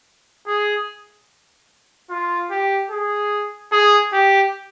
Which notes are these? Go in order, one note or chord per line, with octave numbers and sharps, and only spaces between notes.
G#4
F4
G4
G#4
G#4
G4